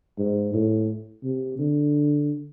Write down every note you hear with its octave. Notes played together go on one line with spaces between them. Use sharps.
G#2
A2
C3
D3